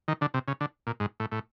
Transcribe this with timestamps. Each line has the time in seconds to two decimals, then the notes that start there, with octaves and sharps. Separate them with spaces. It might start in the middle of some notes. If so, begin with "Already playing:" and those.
0.08 D#3
0.21 D3
0.34 C3
0.48 C#3
0.61 D3
0.87 A#2
1.00 G#2
1.20 A2
1.32 A2